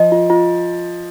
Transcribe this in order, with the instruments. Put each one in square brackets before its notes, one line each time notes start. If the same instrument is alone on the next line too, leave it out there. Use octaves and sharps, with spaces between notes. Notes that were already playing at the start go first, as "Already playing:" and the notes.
Already playing: [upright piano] F3 [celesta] F4 D#5
[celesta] F4
F4